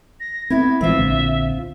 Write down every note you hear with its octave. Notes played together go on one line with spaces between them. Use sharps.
A#6
B3 C4 E4 B4 G#6
A1 E3 G#3 C4 F4 E5
A#1 D3